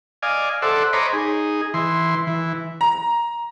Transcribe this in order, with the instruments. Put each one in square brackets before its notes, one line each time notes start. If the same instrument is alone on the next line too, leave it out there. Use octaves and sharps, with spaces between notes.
[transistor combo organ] D5 D#5 F5 G#5
A4 C5 D5 E5 F#5
C5 C#5 D#5 A#5 B5 D6
D#4 G#4
E3 C6
E3
[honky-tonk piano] A#5